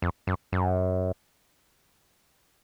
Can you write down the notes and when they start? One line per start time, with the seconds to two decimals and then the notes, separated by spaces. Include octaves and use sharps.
0.02 F2
0.27 F#2
0.52 F#2